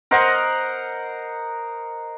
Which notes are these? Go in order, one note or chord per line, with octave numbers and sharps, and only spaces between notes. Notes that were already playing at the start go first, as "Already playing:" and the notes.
A#4 C5 D#5 F#5